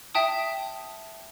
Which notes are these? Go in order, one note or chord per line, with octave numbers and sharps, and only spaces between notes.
E5 G5 A5 D#6